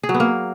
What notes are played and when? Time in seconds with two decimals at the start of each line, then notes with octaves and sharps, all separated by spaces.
0.03 G#4
0.09 F#3
0.14 B3
0.20 A#3